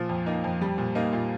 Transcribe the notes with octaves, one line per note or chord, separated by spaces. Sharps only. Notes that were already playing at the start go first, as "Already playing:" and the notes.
Already playing: A#2 F3
F2
A#3 D#4
F2
G3
A#2
A#3 D#4
A#2 F4